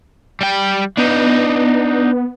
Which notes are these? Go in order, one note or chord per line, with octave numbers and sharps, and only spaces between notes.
G3 G5
B3 D4 D#4